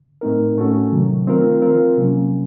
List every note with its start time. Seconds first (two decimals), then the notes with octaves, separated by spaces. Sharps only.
0.21 A2 A3 C4 D#4 A#4
0.57 A2 A3 C#4 F#4 A4
0.92 C3 D#3 F#3
1.27 D#3 A3 C4 F4 A#4
1.62 F3 C4 F4 A#4
1.97 C3 F#3 A#3 C#4